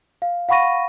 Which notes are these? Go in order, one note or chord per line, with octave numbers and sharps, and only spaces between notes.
F5
F5 F#5 B5 C#6 A#6 D#7